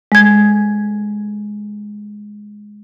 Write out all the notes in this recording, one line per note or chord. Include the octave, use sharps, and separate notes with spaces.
G#3 G#6